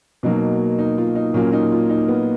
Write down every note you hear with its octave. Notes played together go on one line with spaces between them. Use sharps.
B2 F#3 A#3 D#4
D#4
F4
D#4
A#2 F#3 A#3 C#4
D#4
F4
D#4
B3